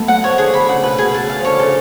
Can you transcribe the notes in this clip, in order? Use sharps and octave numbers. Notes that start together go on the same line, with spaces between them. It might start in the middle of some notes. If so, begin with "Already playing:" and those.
Already playing: A3 B3
F#3 F#5
F3 C#5
D3 G#4
D3 B5
C#3 F#5
B2 B4
G#4
B2
A5
C#3
F5
D3 F3 C#5
C#3 A4